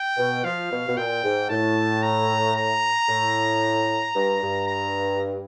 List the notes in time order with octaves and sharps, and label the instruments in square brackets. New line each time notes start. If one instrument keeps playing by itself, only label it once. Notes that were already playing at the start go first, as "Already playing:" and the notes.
Already playing: [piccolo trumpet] G5
[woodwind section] B2
[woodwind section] F3 [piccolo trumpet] F5
[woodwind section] B2
B2
[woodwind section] A#2 [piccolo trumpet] G5
[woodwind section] G#2
[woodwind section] A2 [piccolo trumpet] A5
[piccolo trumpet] A#5
A#5
[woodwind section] A2
G2
G2
[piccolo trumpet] A#5